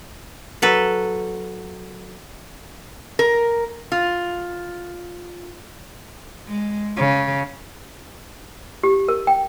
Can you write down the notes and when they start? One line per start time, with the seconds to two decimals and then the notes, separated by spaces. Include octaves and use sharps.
0.62 F#3 A4 B4
3.19 A#4
3.92 F4
6.48 G#3
6.97 C#3
8.83 G4
9.08 A#4
9.27 G5